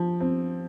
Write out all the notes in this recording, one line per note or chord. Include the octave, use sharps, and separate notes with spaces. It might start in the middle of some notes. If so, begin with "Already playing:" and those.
Already playing: F3
C4